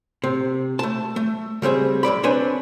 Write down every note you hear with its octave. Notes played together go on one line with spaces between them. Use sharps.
C3
A3 A5
A3
C#3 G3 C4 G#4
F#2 E3 D5 B5
C4 D4 B4 C#5 G#5